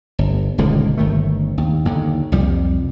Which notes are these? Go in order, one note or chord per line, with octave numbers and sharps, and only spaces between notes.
G1
D#1 C#2 D3 D#3
G1 D#3 A3
D#2
D#2 D3
C2 F2 G3